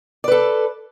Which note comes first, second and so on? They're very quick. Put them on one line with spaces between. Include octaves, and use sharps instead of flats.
D5 B4 A4